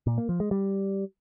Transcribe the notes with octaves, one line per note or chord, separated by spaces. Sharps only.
A#2
A#3
F3
G#3
G3